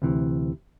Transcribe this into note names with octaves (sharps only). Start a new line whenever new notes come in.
D2 C3 E3